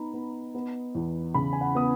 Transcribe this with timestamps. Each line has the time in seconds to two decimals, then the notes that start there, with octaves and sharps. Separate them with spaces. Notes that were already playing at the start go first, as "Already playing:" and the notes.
Already playing: B3 D#4 A#5 B5
0.14 B3
0.55 B3
0.95 E2
1.34 C#3 B5
1.53 G#5
1.61 F#5
1.75 B3 D#6